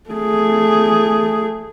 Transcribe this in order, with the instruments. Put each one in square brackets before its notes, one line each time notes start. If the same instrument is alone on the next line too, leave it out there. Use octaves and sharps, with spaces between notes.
[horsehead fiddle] A3 G#4